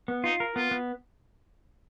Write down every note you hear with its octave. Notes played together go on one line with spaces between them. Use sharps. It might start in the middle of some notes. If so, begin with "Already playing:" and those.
B3
D#4 F4
A#4
B3 F4
B3